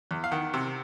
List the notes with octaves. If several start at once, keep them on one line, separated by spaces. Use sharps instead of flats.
E2
F5
D#3 F#5
C3